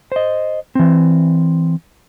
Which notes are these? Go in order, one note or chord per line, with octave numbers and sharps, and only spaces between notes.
C5 D#5
E3 C4